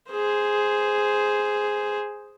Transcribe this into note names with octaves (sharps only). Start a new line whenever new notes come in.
G#4 C5